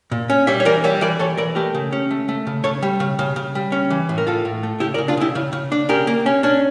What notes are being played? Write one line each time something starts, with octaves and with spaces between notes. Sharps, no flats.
A#2
C#4
G3 C#5 E5
C#5
E3 A#4 D5
G3 C#5 E5
E3 A#4 D5
E3 A4 C#5
E3 A#4 D5
A3 G4 A#4
C#3
C#4
A3
A3
C#3
C#3 A4 C#5
G3
C#3
C#3
C#3
G3
C#4
E3
A2
A#4
A2 F4 A4
A2
A3
C#3 E4 G4
A#4 D5
C#3
D4 F4
C#3 E4 G4
C#3
C#3
D4
C#3 G4 A#4
A#3
C#4
C#4 D4